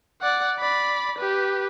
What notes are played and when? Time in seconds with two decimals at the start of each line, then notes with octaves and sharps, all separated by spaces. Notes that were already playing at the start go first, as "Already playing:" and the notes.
0.21 D5 F#5
0.59 D5 B5
1.18 G4 B4